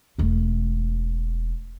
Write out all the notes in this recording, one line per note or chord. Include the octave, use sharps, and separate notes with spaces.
E1 A3